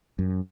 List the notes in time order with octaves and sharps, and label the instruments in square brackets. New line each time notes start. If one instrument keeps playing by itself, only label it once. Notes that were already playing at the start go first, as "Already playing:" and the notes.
[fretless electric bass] F#2